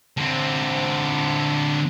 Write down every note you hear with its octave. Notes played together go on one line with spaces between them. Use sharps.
D3 C4